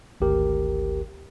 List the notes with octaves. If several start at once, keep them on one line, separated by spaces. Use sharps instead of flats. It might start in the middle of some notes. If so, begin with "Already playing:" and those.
G#1 D2 G4 A#4